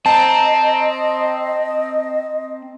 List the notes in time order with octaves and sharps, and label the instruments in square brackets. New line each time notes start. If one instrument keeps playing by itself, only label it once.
[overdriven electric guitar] C4 [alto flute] D#5 [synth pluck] A5 A#5